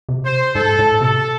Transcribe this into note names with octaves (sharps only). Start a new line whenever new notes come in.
C3
C5
G#2 A4
A2
C3 A4